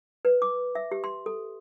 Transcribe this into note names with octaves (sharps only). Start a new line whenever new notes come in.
B4
D6
E5
G4
C6
A4